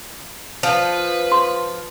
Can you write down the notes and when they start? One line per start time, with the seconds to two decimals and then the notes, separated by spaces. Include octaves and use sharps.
0.63 F3 B4
1.32 C6